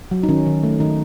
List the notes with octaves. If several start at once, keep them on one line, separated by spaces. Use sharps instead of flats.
F#3
D#4
D#3 C#4
D#3
A3
D#3 D#4